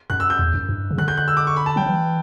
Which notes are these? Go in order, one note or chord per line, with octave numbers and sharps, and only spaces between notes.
F#2 F#6
E6
G6
E2
F#2
G2
C#3
D3 F#6
G6
F#6
E6
D6
C#6
B5
A5
F#3 G5
E3